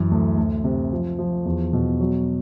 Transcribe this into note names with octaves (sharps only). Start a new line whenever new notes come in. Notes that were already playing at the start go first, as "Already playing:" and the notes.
Already playing: F#2 E3
D2
D2
C3
F3
F3
E2
B2
F#3